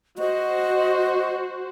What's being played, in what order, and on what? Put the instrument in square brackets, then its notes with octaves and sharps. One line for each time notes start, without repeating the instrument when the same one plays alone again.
[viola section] F#4 C5 [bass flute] D#5